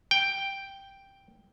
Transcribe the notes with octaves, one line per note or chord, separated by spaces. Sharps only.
G5